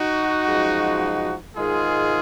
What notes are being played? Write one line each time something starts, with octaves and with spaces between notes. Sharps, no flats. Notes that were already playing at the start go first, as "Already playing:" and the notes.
Already playing: D#4 F#4
F#2 F3 G#3
G#2 D#3 G#3 F4 G#4